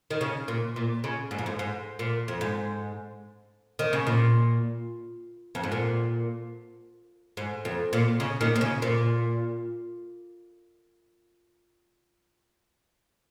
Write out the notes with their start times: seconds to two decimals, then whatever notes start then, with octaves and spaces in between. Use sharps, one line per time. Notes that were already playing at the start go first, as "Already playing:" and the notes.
0.11 D#3
0.21 C#3
0.48 A#2
0.76 A#2
1.04 C#3
1.31 G#2
1.38 F2
1.46 G#2
1.59 G#2
1.99 A#2
2.28 F2
2.41 G#2
3.79 D#3
3.93 C#3
4.07 A#2
5.55 F2
5.64 G#2
5.72 A#2
7.37 G#2
7.65 F2
7.93 A#2
8.20 C#3
8.41 A#2 D#3
8.56 A#2
8.61 C#3
8.82 A#2